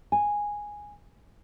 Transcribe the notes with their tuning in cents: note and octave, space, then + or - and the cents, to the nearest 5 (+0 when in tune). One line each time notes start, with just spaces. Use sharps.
G#5 -5